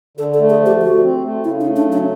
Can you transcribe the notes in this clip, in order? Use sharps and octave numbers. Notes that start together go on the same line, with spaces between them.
D3 A4
A4
A3
G#4
F3
G4
F3 F#4
C4
A3
C#3 E4
D#4
A3
D4
F#3
C#4